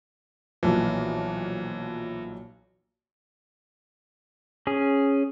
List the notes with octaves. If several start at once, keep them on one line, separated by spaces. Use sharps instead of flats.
B1 A#2 E3 F3
C#4 G#4